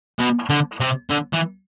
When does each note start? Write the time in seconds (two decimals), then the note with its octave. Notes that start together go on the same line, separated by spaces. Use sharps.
0.19 B2
0.50 D3
0.80 C3
1.10 D3
1.33 E3